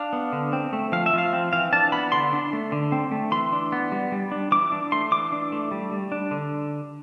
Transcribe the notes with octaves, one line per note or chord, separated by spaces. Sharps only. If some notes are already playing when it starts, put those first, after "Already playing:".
Already playing: D4 F5
B3
D3
C4
A3
F3 F5
E5
F3 F5
C4
E3 F5
D4 A5
B3 B5
D3 C6
D4
A3
D3
C4
A3
E3 C6
D4
B3
G3
G3
D4
E3 D6
D4
A3 C6
E3 D6
D4
A3
G3
G3
D4
D3